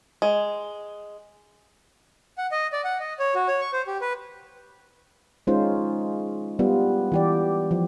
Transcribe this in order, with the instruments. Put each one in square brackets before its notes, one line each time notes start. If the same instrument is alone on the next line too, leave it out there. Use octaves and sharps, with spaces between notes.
[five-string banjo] G#3
[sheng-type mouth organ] F#5
D#5
D5
F#5
D#5
C#5
F#4
C#5
C#6
C5
G4
B4
[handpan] G#3 C#4 D#4 F4 C5
G3 B3 F4
E3 G4 D5
F3